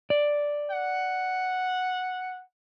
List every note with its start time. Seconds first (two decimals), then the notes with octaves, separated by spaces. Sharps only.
0.10 D5
0.71 F#5